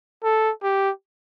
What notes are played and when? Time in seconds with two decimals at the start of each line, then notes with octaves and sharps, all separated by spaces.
0.24 A4
0.63 G4